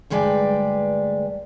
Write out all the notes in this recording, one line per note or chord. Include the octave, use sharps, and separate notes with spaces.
D2 G2 G#3 B4 D5 G5